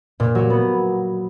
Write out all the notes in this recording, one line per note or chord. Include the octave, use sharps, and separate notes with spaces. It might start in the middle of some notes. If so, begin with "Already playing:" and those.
A#2
F#3
B3